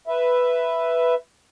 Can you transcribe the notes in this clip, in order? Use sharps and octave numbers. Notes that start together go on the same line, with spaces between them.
B4 E5